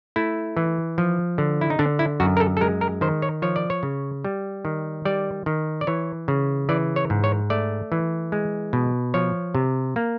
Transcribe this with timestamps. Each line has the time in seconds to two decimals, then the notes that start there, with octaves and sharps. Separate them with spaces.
0.16 A3 E4
0.57 E3
0.98 F3
1.38 D3
1.61 E4
1.70 D#4
1.79 D3 D4
1.99 E4
2.20 F#2 F#4
2.37 A#4
2.40 A4
2.57 A4
2.61 G#3 A#4
2.81 A#4
3.01 D#3 C5
3.22 C#5
3.42 F3 C#5
3.56 D5
3.70 C#5
3.83 C#3
4.24 G3
4.65 D#3
5.05 G3 D5
5.46 D#3
5.81 D5
5.87 E3 C#5
6.28 C#3
6.69 E3 D5
6.96 C#5
7.10 G#2
7.24 C#5
7.50 A3 D5
7.92 E3
8.32 G#3
8.73 B2
9.14 F3 C#5
9.55 C3
9.96 A#3